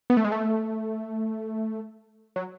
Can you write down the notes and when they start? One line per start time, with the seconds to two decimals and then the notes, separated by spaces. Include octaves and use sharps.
0.10 B3
0.17 A3
0.25 G#3
0.32 A3
2.36 F#3